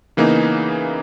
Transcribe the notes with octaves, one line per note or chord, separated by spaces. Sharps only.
C#3 E3 A#3 B3 D#4